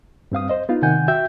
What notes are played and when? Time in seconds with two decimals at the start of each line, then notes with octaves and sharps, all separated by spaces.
0.32 G2 C4 F5 D#6
0.49 C5 D#5
0.69 B3 D#4 F4 F5
0.82 C3 D#3 F#5 G#5 G6
1.08 F#4 E5 G5 G6